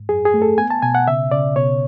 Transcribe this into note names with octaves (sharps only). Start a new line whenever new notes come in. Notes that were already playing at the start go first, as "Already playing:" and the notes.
Already playing: G#2
F#2 G#4
G#4
A3
A4
B3 G#5
A5
B2 G#5
F#5
C#3 E5
C#3 D5
B2 C#5